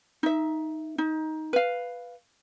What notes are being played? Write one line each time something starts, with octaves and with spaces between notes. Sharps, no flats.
D#4 E5
D#4
B4 F5